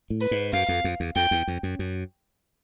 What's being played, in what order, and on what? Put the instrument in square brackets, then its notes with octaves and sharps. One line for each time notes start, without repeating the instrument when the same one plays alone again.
[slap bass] A2
[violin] B4
[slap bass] G#2
[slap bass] F#2 [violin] F5
[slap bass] F2
F2
E2
[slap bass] F2 [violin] G5
[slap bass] E2
F2
F#2
F#2